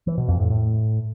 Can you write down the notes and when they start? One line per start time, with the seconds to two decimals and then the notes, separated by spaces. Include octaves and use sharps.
0.07 E3
0.18 B2
0.28 F2
0.39 A2
0.50 A2